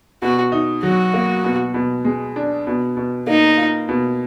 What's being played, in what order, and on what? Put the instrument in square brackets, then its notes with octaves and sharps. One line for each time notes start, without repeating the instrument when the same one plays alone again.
[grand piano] B2 [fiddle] F#4
[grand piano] D#4
[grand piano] F#3 [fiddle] F#4
[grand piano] A#3
B2
B2
G#3
D4
B2
B2
[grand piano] A#3 [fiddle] D#4
[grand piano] F4
B2